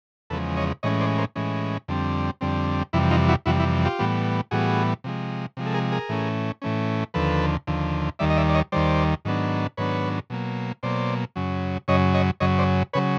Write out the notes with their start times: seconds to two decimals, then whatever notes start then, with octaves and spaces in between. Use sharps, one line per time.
0.30 E2 C#3 F3 G#3 A4 B4
0.57 C#5 D#5
0.83 A2 E3 G#3 C#4 C#5 D#5
1.00 C5 D5
1.18 A#4 C5
1.36 A2 E3 G#3 C#4
1.88 F2 D3 G3 C4
2.41 F2 D3 G3 C4
2.93 F2 C3 E3 G3 E4
3.11 D#4 F4
3.29 E4 F#4
3.46 F2 C3 E3 G3 E4 F#4
3.60 E4
3.85 F4 G4
3.99 A2 E3 G3 B3
4.51 A2 E3 G3 B3 F#4 G#4
5.04 C3 F3 G#3
5.57 C3 F3 G#3
5.66 A4
5.74 G#4 A#4
5.92 G#4 A#4
6.09 A2 E3 A3 C#4
6.62 A2 E3 A3 C#4
7.14 D#2 D3 F3 A4 B4
7.67 D#2 D3 F3
8.19 D#2 D#3 G3 D5 E5
8.30 D#5
8.37 D5 E5
8.49 D5
8.55 C#5 D#5
8.72 D#2 D#3 G3 C5 D5
9.25 G#2 D#3 F#3 B3 D4
9.77 G#2 D#3 F#3 B3 D4 B4 C#5
10.30 B2 F#3 A#3
10.83 B2 F#3 A#3 C5 D5
11.36 F#2 C#3 F#3
11.88 F#2 C#3 F#3 C#5 D#5
12.14 C#5 D#5
12.40 F#2 C#3 F#3 C#5 D#5
12.58 C5 D5
12.93 C#3 F#3 B4 C#5